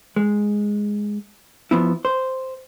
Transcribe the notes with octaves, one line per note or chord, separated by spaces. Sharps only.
G#3
F3 B3 E4
C5